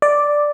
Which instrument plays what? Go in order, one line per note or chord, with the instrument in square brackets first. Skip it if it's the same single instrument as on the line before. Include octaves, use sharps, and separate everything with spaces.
[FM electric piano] D5